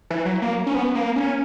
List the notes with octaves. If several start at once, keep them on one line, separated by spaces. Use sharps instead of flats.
E3
F#3
A#3
C#4
B3
A#3
C#4